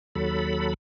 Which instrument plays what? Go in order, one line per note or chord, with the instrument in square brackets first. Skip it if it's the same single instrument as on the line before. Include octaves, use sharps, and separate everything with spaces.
[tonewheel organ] D#2 F#3 A4 B5